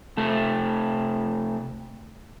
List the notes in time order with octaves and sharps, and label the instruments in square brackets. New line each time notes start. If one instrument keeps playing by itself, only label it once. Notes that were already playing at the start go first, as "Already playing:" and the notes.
[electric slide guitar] C3 A3 A4